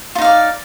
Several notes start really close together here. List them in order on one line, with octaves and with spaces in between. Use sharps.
F4 D#4 F5 D5